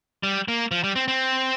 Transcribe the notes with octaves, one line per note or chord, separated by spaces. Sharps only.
G3
A#3
F3
G3
C4
C4